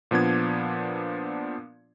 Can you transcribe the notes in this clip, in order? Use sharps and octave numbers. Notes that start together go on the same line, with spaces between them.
A#2 F3 B3 D4 G#6